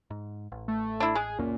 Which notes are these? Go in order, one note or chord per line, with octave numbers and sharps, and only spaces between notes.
G#2
A1
A3
D4 E4
G#3 G#4
C#2 F#2 A#2 C#4